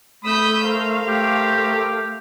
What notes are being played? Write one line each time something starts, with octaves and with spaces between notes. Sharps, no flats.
A3 B5 D#6 E6 G6
A#4 C5 F5
A3 G4